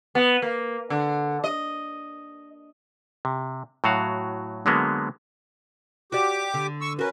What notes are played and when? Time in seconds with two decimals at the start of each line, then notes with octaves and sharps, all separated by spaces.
0.15 B3
0.42 A#3
0.90 D3
1.44 D#5
3.25 C3
3.84 A2 F#3 F#4 F5
4.66 D3 F#3 G#3 A#3 B3
6.12 F#4 G4 D5 D6
6.54 D3
6.81 C#6 E6
6.99 C#4 F#4 A#4 B4